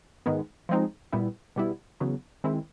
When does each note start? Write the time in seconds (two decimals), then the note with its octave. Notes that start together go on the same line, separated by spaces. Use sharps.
0.26 G#2 D#3 G#3 B3
0.69 F3 G#3 C4 D#4
1.12 A#2 G3 B3 E4
1.56 B2 G3 B3 E4
2.00 E2 C#3 F#3 B3
2.44 D#3 G#3 C4 E4